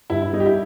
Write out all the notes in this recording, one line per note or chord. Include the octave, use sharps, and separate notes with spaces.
G2 E4
E4
G3 D#4
G4
E4